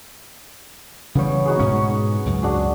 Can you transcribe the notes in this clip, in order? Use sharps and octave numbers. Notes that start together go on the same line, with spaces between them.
C#3 E3 G3 B3 C#5
D#4 F#4 G#4
G#2 B2 C#4 C#6
C#2 F#2
D4 F#4 G#4